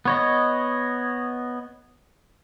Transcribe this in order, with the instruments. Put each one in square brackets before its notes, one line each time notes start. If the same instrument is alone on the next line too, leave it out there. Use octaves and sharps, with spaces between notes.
[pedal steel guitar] B3 C#5 D#5